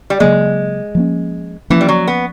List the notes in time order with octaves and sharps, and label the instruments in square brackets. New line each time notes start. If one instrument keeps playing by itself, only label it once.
[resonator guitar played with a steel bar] G3
[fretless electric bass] C#3 F#3 A#3 [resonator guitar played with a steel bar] G#3
[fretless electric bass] F3 A#3 C#4
[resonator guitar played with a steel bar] E3 [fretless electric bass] F3 A#3 C#4
[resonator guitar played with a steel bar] G3
F#3
B3